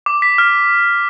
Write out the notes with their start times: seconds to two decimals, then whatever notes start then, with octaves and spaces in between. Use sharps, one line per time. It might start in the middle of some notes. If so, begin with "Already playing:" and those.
0.06 D6
0.22 B6
0.38 F6